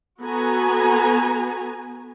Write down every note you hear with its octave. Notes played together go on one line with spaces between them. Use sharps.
B3 F#4 A4 G#5 A#5